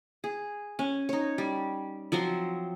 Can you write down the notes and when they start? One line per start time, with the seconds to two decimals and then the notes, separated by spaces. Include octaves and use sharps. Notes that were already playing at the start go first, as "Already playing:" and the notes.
0.24 G#4
0.79 C#4
1.09 D#4 C#5
1.38 G3
2.12 F3 F#3 C4 C6